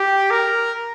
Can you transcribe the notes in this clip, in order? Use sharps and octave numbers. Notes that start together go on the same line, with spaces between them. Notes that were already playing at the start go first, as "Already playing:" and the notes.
Already playing: G4
A#4